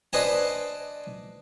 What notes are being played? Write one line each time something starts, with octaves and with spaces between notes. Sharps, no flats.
D4 B4 C5 D#5 G#5 A5